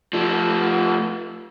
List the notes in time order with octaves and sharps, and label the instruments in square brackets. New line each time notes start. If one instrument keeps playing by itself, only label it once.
[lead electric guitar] F3 A3